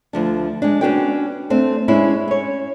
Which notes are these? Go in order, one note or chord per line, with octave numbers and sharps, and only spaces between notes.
D2 F3 D4
G#3 D4
B3 C#4 D4 F#4 B4 G5
A3 C4 D4
G#3 C#4 D4 E4
C#4 C#5